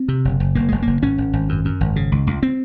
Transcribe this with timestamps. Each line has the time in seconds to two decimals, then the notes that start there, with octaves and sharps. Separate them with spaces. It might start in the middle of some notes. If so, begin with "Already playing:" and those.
Already playing: C4
0.08 C3
0.25 F#1
0.40 F#1
0.55 F#1 A#3
0.68 F#1 G#3
0.82 F#1 A#3
1.02 G#1 C#4
1.18 G#1
1.33 G#1
1.49 F#2
1.65 F#2
1.81 G#1
1.96 C#3
2.12 C#2
2.27 C#2
2.43 C4